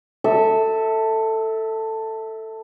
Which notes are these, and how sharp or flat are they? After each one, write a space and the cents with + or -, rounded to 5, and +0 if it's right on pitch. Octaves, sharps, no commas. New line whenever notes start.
A4 +10 E5 -20